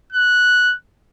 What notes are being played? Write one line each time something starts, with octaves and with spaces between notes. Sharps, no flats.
F#6